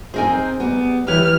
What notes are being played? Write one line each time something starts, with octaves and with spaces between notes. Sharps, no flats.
C4 D#4 G#4 A#4 C5 G#5
G3 B3
E3 G4 B4 C#5 F6